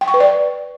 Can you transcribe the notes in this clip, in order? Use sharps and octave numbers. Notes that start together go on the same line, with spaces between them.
G5
C#6
B4
D5